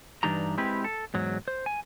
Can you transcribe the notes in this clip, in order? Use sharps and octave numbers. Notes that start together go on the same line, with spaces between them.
G2 E3 D4 D#4 G4 A#5
G#3 C4 E4 G4 B4
A4
E2 G#2 F#3
C5
G#5